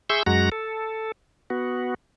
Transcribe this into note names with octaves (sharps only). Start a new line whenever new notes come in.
G#4 E5 C6 C#6 E6 G6
F#2 G#3 F#4 F#5 A#5 A#6
A4
B3 F#4